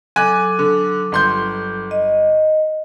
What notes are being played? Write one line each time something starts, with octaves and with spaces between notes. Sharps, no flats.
F#3 A4 G#5 D6 F#6
D3
G1 C6 G6
D#5